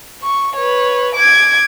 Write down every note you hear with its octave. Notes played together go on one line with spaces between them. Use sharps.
C#6
B4 C#5
D6 G#6